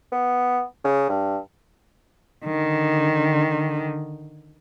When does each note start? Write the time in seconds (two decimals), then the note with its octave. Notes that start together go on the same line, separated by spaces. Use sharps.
0.12 B3
0.85 C#3
1.09 G2
2.45 D3 D#3